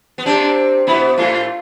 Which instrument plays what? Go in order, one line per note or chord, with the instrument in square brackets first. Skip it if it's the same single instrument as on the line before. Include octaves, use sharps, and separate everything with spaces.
[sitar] B3
[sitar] C3 C4 [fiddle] D4
[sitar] B2 B3 [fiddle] E4
[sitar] A2 A3 [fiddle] F4